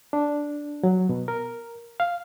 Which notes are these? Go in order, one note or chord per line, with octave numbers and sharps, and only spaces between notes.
D4
F#3
B2
A#4
F5